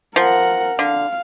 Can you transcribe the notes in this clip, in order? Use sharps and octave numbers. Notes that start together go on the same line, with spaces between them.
F3 A#4 F#5
D3 F5